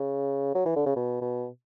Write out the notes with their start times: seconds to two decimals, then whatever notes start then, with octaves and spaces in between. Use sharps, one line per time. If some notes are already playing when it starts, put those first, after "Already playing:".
Already playing: C#3
0.55 F#3
0.66 E3
0.76 D3
0.86 C#3
0.96 B2
1.22 B2